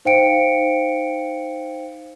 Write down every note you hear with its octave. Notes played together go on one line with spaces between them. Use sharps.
D#4 C5 F5 G5 C#7 D7